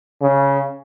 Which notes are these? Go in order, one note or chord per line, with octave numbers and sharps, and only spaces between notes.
C#3